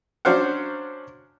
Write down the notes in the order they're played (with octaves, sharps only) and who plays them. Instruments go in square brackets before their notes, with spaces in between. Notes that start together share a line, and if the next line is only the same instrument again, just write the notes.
[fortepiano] F#3 C#4 D4 C5 F5 F#5